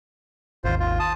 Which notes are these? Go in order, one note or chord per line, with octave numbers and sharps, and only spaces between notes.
G#1 D#2 F4 C5
F4
A5 D#6